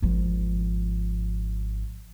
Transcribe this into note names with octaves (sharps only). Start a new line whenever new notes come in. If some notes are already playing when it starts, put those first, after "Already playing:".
G#1 F3